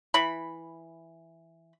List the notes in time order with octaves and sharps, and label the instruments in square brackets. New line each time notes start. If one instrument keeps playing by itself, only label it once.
[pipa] E3 B5